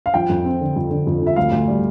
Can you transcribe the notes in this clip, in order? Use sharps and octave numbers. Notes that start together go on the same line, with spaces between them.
F5
F3 G5
F2
C4
D3
F2
D3
F2
F3 E5
D2 F5
D2
G3